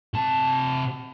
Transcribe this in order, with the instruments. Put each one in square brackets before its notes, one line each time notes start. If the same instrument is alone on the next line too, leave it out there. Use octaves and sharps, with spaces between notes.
[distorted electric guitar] C3 A5